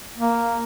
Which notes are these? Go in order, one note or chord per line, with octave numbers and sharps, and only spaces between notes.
A#3